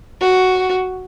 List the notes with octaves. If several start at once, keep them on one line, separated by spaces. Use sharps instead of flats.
F#4